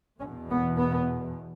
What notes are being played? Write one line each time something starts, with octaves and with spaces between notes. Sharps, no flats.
E2 B2 C#4
B3
B3